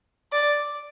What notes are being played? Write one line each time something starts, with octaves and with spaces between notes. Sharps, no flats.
D5